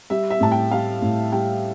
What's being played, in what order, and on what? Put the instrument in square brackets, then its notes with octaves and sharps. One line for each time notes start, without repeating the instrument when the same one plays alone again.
[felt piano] G3 E5
E5
A2 A5
G5
G3 F5
A2
G3 G5